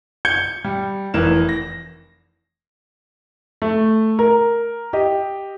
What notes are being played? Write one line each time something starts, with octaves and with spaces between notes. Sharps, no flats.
G6 G#6 C#7 G7
G3
F1 E3 A#4 E7
A#6
A3
A#4
G4 D#5